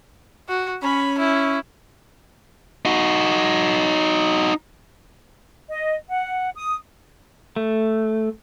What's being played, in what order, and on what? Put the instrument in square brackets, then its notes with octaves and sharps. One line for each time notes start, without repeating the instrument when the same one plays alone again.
[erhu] F#4
[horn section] C#4 [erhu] B5
[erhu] E4
[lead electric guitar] D#4 F#4
[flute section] D#5
F#5
D#6
[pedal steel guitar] A3